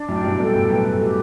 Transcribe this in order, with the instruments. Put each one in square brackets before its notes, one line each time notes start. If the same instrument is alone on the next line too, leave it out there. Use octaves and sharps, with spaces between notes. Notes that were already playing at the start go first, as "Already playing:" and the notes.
Already playing: [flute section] D4
[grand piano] F#2 A2 [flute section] G5
[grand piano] G2 B2
[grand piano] G2 B2 [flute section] A4
[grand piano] F#2 A2
[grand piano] F#2 A2 [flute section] B4
[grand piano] B2 [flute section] G4